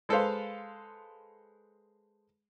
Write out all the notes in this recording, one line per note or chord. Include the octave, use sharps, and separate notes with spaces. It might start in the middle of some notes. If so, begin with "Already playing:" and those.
G#3 A4 B4 C5 F5